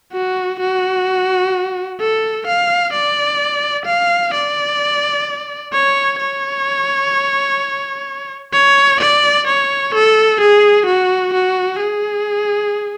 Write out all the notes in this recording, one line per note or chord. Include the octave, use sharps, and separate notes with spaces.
F#4
F#4
A4
F5
D5
F5
D5
C#5
C#5
C#5
D5
C#5
A4
G#4
F#4
F#4
G#4